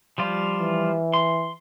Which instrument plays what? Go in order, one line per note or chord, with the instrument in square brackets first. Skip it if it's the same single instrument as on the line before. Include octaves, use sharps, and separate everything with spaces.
[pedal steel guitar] F3 G3 F4
[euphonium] E3
[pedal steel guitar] C6